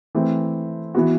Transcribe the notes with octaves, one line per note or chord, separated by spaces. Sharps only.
E3 A3 C4
E3 B3 F#4